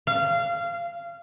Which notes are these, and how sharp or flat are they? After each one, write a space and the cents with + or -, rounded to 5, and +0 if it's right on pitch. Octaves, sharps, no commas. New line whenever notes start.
F5 -25